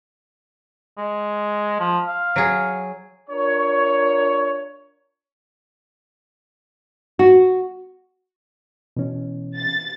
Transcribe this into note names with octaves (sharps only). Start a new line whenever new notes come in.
G#3
F3
F5
F#3 G#4
D4 F4 A#4 C#5
F#4
B2 E3 C#4
A6